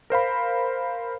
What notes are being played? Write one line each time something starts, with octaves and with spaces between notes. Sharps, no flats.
A#4 C5 F5 B5